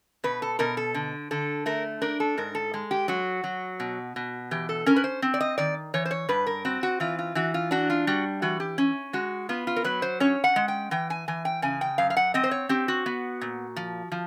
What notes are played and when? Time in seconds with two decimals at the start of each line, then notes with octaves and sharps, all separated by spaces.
0.24 B2 B4
0.42 A4
0.59 B2 A#4
0.77 A4
0.94 D3
1.31 D3 A4
1.66 A3 A#4
2.02 D4 A#4
2.20 A4
2.38 G#2 A#4
2.55 A4
2.74 G#3
2.91 G4
3.08 F#3 F#4
3.44 F#3
3.80 B2
4.16 B2
4.51 E3 G4
4.69 A4
4.86 C#4 A#4
4.96 B4
5.04 C5
5.22 C4
5.34 D5
5.41 D#5
5.58 D#3 D5
5.94 E3 C#5
6.05 C5
6.11 C#5
6.29 G2 B4
6.47 A#4
6.65 C4 F#4
6.83 F#4
7.00 E3 F4
7.19 F4
7.35 E3 F#4
7.54 F4
7.71 D4 F#4
7.90 F4
8.07 G3 F#4
8.42 E3 F#4
8.60 G4
8.78 C#4
9.13 G#3 F#4
9.49 B3 F4
9.67 F4
9.76 A#4
9.84 F#3 B4
10.02 C5
10.20 C#4 C#5
10.44 F#5
10.56 G#3
10.68 G5
10.91 E3 G5
11.10 G#5
11.28 E3 G#5
11.45 G5
11.62 C#3 G#5
11.81 G5
11.98 F#2 F5
12.10 F5
12.17 F#5
12.34 C4 D#5
12.44 C5
12.51 C#5
12.69 C4 G4
12.88 F#4
13.06 B3
13.41 A#2
13.76 F3
14.12 F3